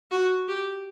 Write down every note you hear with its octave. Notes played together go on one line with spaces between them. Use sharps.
F#4
G4